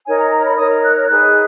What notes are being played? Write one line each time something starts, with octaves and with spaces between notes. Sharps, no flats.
D#4 A#4 C#5 G#5
A#5
A#5
B5
D#4 A#4 C#5 D#6
F6
F#6
F6
D#4 G#4 B4 F#6